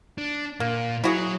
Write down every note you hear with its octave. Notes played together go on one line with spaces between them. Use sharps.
D4
A#2 A#3
F#3 E4 F#4 G#4